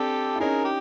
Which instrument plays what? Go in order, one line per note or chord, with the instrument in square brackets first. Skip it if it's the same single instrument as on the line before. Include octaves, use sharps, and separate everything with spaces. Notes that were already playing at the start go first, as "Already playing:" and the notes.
Already playing: [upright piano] C4 D4 [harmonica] G4 A4
[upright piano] E4
[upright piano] C#4 D#4 [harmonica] G#4 A#4
[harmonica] G4